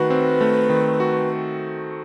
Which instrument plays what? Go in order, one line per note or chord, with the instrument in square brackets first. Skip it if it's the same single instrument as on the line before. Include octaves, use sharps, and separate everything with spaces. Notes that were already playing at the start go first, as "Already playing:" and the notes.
Already playing: [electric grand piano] D#3 A3 F#4 [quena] B4
[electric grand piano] C4
A3
D#3
F#4